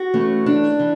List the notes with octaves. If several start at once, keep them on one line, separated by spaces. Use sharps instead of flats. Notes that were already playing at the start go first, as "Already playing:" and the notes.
Already playing: F#4
E3 A3 C#4
D4
E3